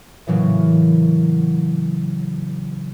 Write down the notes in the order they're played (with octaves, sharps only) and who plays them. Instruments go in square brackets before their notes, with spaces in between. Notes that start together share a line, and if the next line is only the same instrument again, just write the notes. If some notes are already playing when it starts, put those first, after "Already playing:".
[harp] A2 C#3 E3 F#3 A#3